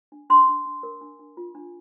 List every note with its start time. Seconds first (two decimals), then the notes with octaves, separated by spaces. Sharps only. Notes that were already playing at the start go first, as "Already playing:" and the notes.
0.12 D4
0.30 D4 C6
0.48 D4
0.66 D4
0.83 A#4
1.01 D4
1.19 D4
1.37 F4
1.55 D4